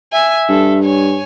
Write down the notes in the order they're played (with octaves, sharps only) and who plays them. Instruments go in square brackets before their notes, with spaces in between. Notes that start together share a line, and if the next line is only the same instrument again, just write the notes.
[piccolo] E5 [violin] G#5
[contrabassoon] G2 [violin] A4
[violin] C#5 G#5